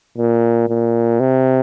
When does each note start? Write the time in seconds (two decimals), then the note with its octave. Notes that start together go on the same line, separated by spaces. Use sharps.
0.18 A#2
0.69 A#2
1.20 C3